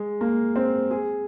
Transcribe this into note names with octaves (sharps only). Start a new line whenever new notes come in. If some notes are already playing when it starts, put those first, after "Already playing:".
Already playing: G#3
A#3
C4
G#4